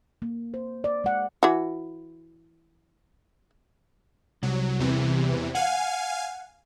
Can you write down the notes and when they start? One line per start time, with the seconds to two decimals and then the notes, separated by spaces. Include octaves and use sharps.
0.22 A#3
0.54 C5
0.84 D5
1.04 G#3 F#5
1.43 E3 F#4
4.43 C2 F#3
4.79 E2 C3 E3
5.55 F5 F#5 G#5